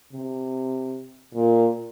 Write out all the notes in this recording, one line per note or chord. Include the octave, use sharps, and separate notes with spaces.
C3
A#2